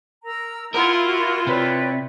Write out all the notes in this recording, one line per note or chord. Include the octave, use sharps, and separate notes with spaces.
A#4 A#5 E6
E4 F4 A#4 F#5 F6
F#4
C3 B4 C#5 D5